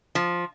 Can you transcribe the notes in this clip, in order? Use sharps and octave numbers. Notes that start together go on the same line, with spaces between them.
F3